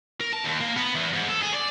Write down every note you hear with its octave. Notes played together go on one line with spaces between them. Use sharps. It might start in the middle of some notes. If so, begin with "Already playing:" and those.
A#4
A5
D#2
A#3
B3
E2
G#2
A4
G#4
D5